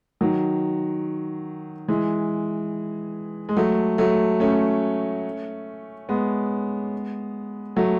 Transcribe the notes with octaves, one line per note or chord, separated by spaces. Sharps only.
D#3 F#3
E3 G#3
G#3
F#3 A3
F#3 A3
A3 C#4
G#3 B3
F#3 A3